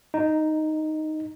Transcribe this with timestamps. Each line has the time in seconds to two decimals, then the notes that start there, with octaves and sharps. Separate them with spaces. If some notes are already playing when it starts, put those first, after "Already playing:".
0.14 D#4